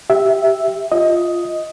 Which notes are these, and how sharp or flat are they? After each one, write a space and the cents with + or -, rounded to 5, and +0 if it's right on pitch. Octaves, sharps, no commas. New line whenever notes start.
G4 +0 E5 +0
F4 +0 D#5 +10